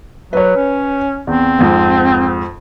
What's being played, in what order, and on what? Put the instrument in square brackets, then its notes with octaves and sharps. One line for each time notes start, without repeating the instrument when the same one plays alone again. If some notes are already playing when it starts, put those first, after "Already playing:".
[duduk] F#3 [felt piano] B4 C#5
[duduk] C#4
[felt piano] E2 [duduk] C4
[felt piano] F2 G#2